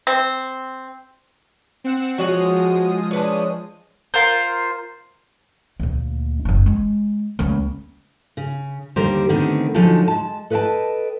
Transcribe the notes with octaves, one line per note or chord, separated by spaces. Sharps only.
C4
C4 F#5 E7
F3 G#3 F#4 C#5 F#5 D#6
D4 B4 C#5
F4 A#4 C5
D2 A#2
F#1 E4
G#3
C#2 A#3
C#3
D#2 D3 G3 G4 A#4 C5
D3 D#3 A3 B3 C4
D3 F3 F#3 G#3 D#4 A4
G#3 A5
A4 B4 D#5 E5 G5 A5